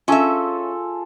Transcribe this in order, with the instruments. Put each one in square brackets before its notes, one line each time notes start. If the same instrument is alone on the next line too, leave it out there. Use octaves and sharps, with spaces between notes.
[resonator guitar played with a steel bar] C#4 E5 [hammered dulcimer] F4 G#4 A4